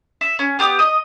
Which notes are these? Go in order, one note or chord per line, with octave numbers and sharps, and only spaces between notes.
E5
C#4
B3 G4 D6 D#6
D#5 D#6